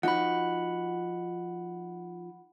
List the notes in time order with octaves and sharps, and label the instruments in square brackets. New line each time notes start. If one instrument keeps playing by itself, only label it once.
[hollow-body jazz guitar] F3 D#4 F#4 [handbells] F#5 B5